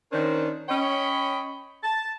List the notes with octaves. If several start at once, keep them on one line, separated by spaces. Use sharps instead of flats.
D#3 C#4 D4 A#4 C5
C#4 C#5 D#5 G5 B5
A5